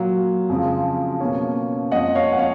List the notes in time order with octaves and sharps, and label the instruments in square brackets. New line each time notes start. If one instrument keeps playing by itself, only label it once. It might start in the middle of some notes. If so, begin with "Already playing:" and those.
Already playing: [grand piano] A#2 F#3 A#3
F2 C#3 F3
B2 A#3 C#4
F2 F3 A#3 D#5 F#5
C#5 F5
F#5
C#5 F5